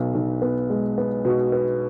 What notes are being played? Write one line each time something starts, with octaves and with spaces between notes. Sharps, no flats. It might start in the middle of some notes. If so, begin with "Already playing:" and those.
Already playing: B1 B3
B1
B3
G#3
B3
B2
B3